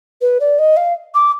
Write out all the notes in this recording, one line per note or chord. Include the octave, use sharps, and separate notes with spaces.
B4
D5
D#5
F5
D6